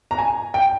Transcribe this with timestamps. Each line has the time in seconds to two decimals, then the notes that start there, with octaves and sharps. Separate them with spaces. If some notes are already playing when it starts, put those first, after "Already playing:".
0.11 A#5
0.18 G#5
0.54 G5